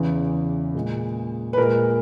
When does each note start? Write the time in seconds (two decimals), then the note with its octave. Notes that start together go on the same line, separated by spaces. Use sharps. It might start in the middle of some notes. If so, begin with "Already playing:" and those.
Already playing: E2 C#3 E3
0.75 A#2 G#3
1.53 B4
1.58 A#2 G#3 A#4